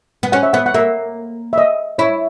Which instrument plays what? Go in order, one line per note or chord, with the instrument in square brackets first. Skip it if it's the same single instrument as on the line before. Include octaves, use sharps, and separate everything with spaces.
[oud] B3
[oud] C#4 [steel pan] F#5
[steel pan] E5
[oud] B3 [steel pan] F#5
[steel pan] F#5
[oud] A#3 [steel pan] E5
[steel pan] E5
D#5
[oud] E4 [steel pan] C#5